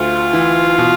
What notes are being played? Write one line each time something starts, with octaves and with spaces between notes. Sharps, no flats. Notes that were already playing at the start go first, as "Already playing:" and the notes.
Already playing: D2 A3 F4
E3
B2